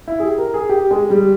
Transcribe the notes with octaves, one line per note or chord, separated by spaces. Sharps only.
E4
G#4
G4
A#4
G#4
G4
G#3
G3